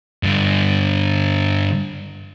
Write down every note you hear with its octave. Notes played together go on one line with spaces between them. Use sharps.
G2 D3